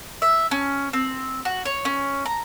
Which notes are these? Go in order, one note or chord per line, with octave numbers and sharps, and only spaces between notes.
E5
C#4
C4
F#4
C#5
C#4
A#5